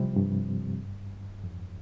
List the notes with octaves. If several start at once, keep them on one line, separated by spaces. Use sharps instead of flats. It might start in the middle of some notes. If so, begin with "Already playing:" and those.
Already playing: C3 F3 G3 C4
G2
F2